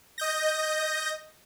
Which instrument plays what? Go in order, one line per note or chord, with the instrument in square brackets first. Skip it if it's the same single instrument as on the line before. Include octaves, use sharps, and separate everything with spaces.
[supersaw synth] D#5 G6 A#6